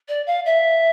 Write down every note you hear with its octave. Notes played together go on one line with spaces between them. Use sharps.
D5
F5
E5